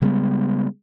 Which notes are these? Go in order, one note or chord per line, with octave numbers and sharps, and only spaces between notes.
C#3 G3 G#3 B3